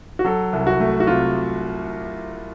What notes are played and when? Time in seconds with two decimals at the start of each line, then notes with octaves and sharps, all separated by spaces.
0.19 F#4
0.24 F#3 A4
0.53 C2
0.67 F#4
0.80 A3
1.00 F#4
1.07 C3 F4